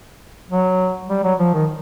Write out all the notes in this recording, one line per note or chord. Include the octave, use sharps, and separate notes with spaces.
F#3
G3
F#3
F3
D#3